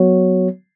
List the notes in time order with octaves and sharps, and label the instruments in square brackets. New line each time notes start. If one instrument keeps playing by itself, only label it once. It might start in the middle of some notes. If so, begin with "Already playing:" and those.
Already playing: [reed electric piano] F#3 B3 F#4 C#5